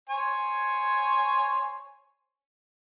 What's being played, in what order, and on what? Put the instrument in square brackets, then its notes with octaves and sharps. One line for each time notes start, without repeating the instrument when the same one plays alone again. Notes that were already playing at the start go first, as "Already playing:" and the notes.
[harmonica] C5 C#5 G#5